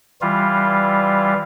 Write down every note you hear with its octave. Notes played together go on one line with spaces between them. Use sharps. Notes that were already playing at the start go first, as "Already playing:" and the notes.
E3 G3 F4